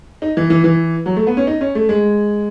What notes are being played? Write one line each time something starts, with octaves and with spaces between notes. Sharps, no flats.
D#4
E3
E3
E3
F#3
A3
B3
C#4
D#4
C#4
A3
G#3